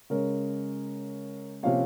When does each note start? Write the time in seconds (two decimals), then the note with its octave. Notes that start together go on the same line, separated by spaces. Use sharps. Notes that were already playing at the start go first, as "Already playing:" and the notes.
0.10 C#3 G#3 C#4 A#4 C#5
1.63 C3 F3 A#3 C#4 C#5 F5